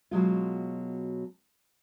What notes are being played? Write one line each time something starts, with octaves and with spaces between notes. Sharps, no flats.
B2 F#3 G#3 F4